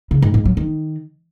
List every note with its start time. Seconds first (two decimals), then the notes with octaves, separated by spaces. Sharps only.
0.11 C#3
0.22 G#2
0.34 G#2
0.45 F#3
0.57 D#3